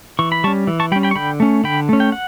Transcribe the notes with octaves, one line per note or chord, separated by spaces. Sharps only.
E3 C#6
B5
G3 C#4 A5 C#6
E3
A5 C#6
G3 C#4 G5 B5
G5 B5
C#6
D3 G5 B5
A3 C#4
D3 G5 B5
A3 C#4
G5
F#5